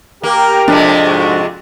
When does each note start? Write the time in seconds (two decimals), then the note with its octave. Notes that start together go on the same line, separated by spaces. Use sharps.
0.23 A#3 G4 A#4
0.68 F2 C3 G#3 D4
1.05 G#2 F#4